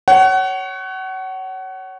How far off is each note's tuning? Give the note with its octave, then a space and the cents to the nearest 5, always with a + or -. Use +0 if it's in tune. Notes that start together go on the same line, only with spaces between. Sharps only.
C#5 +0 F#5 +30